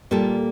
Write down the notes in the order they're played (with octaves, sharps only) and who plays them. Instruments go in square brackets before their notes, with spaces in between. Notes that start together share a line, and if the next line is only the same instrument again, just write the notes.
[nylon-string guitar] A#2 G3 A#3 F4 A4